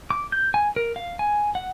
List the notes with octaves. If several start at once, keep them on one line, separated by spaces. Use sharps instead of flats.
D6
G6
G#5
A#4
F5
G#5
F#5